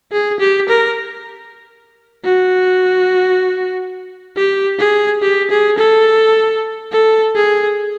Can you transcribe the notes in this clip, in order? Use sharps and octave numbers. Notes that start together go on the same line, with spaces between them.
G#4
G4
A#4
F#4
G4
G#4
G4
G#4
A4
A4
G#4